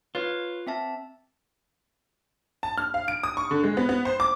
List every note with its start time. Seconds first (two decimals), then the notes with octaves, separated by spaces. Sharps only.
0.15 F4 B4 C#5
0.67 C4 E5 A5
2.63 A5
2.78 F6
2.94 F5
3.08 D7
3.23 D#6
3.37 C#6
3.51 D3
3.63 G#3
3.77 B3
3.89 B3
4.05 C5
4.20 D6